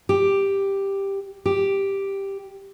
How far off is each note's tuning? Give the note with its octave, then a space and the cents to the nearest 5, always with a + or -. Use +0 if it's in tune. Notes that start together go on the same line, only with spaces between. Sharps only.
G4 +5
G4 +0